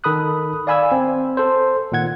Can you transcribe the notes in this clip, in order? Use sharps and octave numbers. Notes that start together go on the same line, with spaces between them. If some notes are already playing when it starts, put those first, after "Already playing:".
D#3 A4 B5 D#6 F#6
D5 F5 G#5 B5 E6 G#6
C4
A4 C5
A#2 D#3 F#5 G#6